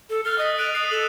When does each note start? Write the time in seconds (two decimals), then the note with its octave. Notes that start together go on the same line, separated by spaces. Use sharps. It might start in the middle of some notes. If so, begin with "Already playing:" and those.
0.10 A4
0.25 F6 F#6 A6 G7
0.38 D#5 D#6 A6 B6
0.58 F#6 D7 D#7 F7
0.74 D#6 C7
0.91 A4 E7 F#7